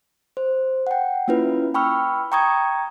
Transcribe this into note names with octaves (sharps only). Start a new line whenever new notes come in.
C5
F#5 G5
A#3 C#4 E4 F4 B4
G5 B5 C#6 E6 F6
G5 A#5 C#6 D#6 G#6